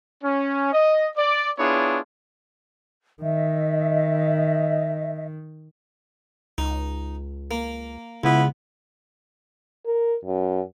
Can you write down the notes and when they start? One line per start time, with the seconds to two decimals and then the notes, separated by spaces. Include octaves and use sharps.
0.23 C#4
0.73 D#5
1.17 D5
1.58 B3 D4 E4 F4 G#4 C#5
3.22 D#3 D#5 E5
6.58 C#2 D#4
7.51 A#3
8.24 C#2 C#3 B3 E4
9.86 A#4
10.25 F#2